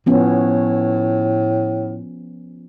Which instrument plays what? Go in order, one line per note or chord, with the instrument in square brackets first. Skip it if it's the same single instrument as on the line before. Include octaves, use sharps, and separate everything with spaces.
[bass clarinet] A2 [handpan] F3 B3 C#4